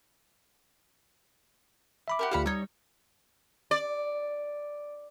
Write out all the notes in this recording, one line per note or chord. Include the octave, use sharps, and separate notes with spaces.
E5 B5 D6
F#4 G4 A#4
D2 F4 G4 F5 F#5 B5
G3 D#4 C#5
D5